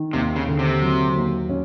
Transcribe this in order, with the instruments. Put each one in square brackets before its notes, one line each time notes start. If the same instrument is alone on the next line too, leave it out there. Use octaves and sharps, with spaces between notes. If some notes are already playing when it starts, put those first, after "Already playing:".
Already playing: [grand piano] D#3
[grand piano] D#2 [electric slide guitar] C3
[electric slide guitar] C#3
[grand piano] D3
[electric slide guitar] C3
[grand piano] F#3
D#2
C#4